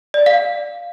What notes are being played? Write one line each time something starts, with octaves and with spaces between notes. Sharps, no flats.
D5
F5